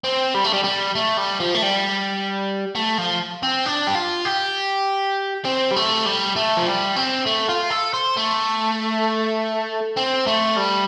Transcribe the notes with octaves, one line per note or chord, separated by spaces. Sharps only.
C4
G3
A3
G3
G3
A3
G3
F3
A3
G3
A3
F3
C4
D4
G4
F4
G4
C4
G3
A3
G3
A3
F3
G3
C4
A3
F4
A4
C5
A3
C4
A3
G3